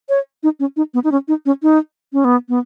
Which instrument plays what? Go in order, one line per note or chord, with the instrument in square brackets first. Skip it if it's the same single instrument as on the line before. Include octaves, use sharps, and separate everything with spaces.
[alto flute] C#5
D#4
C#4
D#4
B3
D#4
C#4
D#4
C#4
D#4
C#4
B3
B3